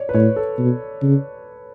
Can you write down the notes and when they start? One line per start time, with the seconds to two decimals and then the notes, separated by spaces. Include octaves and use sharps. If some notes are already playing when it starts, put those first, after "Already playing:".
Already playing: C#5 D5
0.09 B4
0.15 A2 C#5
0.36 A4
0.58 B2
1.03 C#3